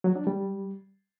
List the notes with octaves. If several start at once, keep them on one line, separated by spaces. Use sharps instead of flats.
F#3
D4
G3